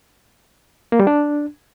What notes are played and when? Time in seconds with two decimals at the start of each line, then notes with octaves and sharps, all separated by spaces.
0.92 A#3
1.00 G3
1.07 D4